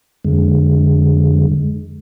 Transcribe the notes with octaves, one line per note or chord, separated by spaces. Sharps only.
F2 D3 G#3